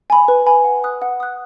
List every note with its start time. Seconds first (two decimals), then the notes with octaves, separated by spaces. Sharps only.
0.10 G#5 B5
0.28 B4
0.46 G#5 B5
0.64 F#5
0.84 D#6 F#6
1.02 F#5
1.20 D#6 F#6